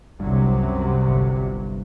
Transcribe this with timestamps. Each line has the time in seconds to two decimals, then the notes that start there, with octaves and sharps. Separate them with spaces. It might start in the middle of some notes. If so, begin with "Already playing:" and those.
0.19 G1 C2 G2 C3 F#3
0.63 F#2
1.07 G1 G2